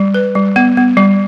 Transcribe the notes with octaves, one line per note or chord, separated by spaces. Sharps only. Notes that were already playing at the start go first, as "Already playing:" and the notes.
Already playing: G3
B4
G3
B3
B3
G3